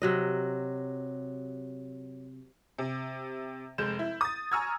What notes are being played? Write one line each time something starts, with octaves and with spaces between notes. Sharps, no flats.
C3 F#3 D#5
C3
F1 G#3 G6 E7
E4
D#6 A6
G#5 A#5 C#6 E6 F6 G#6